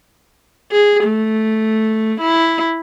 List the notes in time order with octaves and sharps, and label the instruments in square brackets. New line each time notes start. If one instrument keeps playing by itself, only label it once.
[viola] G#4
A3
E4